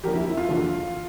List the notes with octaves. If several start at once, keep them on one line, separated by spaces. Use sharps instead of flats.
F2 D3 F3 G4 A#4
E4
E4
F4
F2 D3 F3